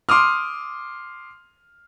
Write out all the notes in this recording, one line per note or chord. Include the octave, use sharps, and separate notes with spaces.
C6 D6 D#6 F6